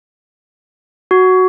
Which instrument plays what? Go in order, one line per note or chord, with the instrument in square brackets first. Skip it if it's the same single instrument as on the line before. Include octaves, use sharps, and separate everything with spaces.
[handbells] F#4